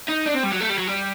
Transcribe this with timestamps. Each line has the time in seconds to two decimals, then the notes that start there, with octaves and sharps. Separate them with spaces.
0.09 D#4
0.27 D4
0.35 C4
0.44 G3
0.52 F#3
0.61 A3
0.70 G3
0.78 F#3
0.87 G3